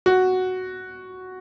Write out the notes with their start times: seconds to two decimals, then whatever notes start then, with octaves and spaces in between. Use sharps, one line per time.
0.06 F#4